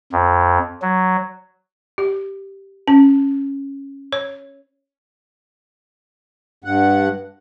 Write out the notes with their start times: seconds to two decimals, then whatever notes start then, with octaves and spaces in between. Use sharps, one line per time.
0.12 F2
0.82 F#3
1.98 G4
2.88 C#4
4.13 C#5
6.64 G2 F#5